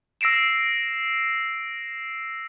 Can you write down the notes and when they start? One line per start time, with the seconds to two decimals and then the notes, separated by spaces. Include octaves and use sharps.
0.21 E6 A#6 C7 D7 E7